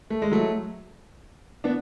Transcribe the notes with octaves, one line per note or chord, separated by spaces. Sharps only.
A3
G#3
F#3 A3
B3 D4